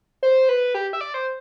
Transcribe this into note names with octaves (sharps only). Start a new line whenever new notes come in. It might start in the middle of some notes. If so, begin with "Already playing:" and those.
C5
B4
G4
E5
D5
C5